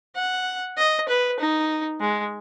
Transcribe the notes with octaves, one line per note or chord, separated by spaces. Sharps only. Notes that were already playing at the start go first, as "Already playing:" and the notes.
F#5
D#5
B4
D#4
G#3